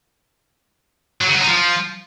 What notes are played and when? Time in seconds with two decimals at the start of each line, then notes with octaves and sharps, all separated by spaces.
1.21 F#3
1.28 C#3
1.34 F#3
1.41 D#4
1.47 F3